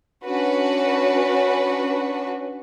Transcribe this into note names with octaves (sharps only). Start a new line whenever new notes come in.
C#4 D4 F#4 B4